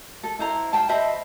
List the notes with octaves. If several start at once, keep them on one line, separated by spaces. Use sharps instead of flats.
A4
E4 C5 A#5
F5 G5 A5
C5 D#5 E5 B5